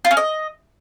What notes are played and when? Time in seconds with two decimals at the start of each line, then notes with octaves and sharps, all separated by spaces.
0.05 F4
0.11 C#4
0.17 D#5